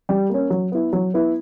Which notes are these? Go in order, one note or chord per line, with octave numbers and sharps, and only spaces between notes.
G3
A#3 C#4
F#3
B3 E4
F#3
B3 E4